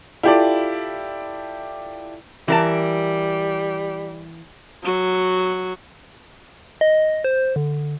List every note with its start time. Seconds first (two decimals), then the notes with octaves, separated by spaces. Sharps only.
0.23 E4 F4 G4 A4 D5
2.48 E3 G3 A#4 A5
4.84 F#3 F#4
6.81 D#5
7.24 C5
7.56 D3